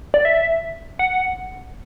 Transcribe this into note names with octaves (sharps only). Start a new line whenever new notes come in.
D5
E5
F#5